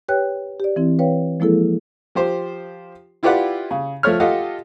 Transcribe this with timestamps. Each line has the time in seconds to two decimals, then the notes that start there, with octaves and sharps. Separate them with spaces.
0.09 G4 B4 C#5 G5 F#6
0.60 G4 D5
0.76 E3 C4 E4
0.99 B4 C#5 F5 G5
1.40 F3 G#3 A#3 E4 G#4 A4
2.15 F3 G4 C5
3.23 E4 F4 G4 B4 D5 F#5
3.71 C#3
4.03 F3 A3 C#5 F6
4.20 F4 G4 A4 D#5 F5 F#5